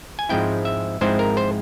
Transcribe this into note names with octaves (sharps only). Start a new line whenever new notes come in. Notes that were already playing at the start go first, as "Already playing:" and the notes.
G#5
G#2 F3 G#3 C4 E4 G5
E5
G#2 F3 G#3 C4 E4 C5
A#4
C5